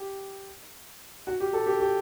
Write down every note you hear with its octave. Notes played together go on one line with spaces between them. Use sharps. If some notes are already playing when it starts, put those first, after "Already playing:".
Already playing: G4
F#4
G4
G4 A4
G4 A4
G4 A4